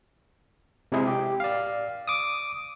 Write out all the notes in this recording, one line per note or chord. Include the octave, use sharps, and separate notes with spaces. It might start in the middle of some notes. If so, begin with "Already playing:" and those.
C3 G#3 E4 G#4
G4
D5 F5
D6 D#6